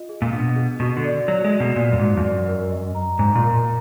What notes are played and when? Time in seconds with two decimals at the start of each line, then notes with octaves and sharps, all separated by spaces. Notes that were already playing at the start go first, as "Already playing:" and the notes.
Already playing: F4 D#5
0.09 G#4
0.22 A#2
0.33 B2 D4
0.56 G#4
0.80 B2 F#4
0.97 D3
1.04 D5
1.27 F#3 D5
1.44 G#3
1.52 F#4
1.60 B2
1.75 A#2 D5
1.92 F#2
1.99 G#2 F#4
2.17 F2
2.24 F#2 D5
2.48 A#4
2.71 D#5
2.95 A#5
3.19 G#2 A#5
3.35 A#2
3.43 A#4
3.51 A#2